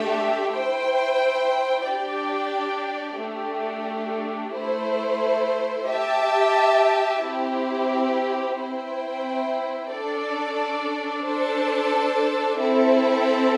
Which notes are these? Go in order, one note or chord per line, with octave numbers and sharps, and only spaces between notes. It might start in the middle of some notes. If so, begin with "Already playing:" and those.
Already playing: A3 D4 G4 E5
E4 C5 G5
D4 G4 D5 G5
A3 D4 G4
A3 E4 C5
G4 E5 A5
C4 E4 G4
C4 E4 C5 G5
D4 A4 D5
D4 A4 C5 A5
C4 E4 A4 E5